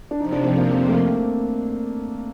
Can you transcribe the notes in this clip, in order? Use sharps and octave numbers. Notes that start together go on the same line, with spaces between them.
D4
F2 C3 F3 D#4
D4
C4
A#3
C4
A3
A#3